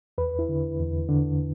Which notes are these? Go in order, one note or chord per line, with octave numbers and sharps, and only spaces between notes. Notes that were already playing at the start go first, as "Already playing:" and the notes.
E2 B4
E4
D3
E2
D3